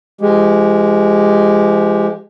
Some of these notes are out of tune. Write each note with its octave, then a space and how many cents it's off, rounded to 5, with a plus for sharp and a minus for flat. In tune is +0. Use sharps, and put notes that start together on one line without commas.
F3 -45 G#3 +0 G4 -5